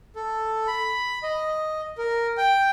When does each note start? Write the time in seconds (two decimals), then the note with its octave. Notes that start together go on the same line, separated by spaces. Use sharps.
0.16 A4
0.67 B5
1.23 D#5
1.98 A#4
2.37 G5